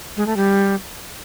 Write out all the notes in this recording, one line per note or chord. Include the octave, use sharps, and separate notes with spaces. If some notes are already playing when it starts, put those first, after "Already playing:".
G#3
A3
G3